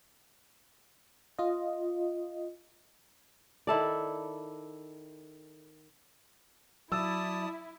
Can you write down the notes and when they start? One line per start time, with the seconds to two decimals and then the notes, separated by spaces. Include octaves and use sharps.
1.38 F4 D#5
3.67 D#3 E4 A4 D5
6.92 F#3 E4 D5 A5 D#6 E6